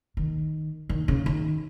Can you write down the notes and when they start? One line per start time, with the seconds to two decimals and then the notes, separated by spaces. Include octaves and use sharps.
0.17 D#3
0.89 D#3
1.08 C#3
1.26 D#3